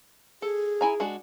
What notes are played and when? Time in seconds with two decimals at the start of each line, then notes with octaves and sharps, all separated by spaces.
0.42 G#4 A4
0.81 E4 G#5 A#5
1.00 G#3 D4 F#4